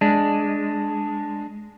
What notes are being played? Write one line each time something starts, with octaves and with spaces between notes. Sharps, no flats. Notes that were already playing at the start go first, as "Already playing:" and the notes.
G#3 D4